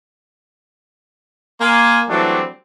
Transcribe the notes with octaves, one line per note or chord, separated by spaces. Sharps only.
A#3 G#5 C6
E3 F#3 G3 A3 C4 D4